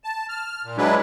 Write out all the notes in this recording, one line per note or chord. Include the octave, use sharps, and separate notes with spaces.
A5
F6
A#2
F#3 G#3 D4 E4 B4